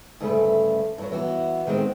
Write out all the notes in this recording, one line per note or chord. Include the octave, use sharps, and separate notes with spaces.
D2 G2 C#3 A3 B4
G2 F#3
E3 B3 F#4
D#3 G#3 B3 C4